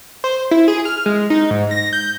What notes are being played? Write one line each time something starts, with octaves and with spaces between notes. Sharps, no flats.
C5
E4
G#4
F6
G#3
D#4
G#2
A#6
G6